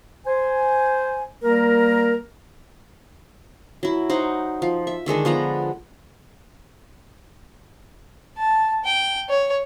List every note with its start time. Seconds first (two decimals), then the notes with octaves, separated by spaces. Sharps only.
0.27 C5 G#5
1.43 G3 A#3 A#4
3.83 F#3 E4
4.10 D#4 C5 F#5
4.62 F3
4.87 E5
5.06 D3 D#3 G#3 D4
5.25 F3 B3 B4 A#5
8.38 A5
8.84 G5
9.29 C#5